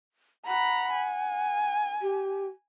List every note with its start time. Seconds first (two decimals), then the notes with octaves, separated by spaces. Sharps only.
0.47 F#5 A#5 B5
0.93 G#5
2.02 G4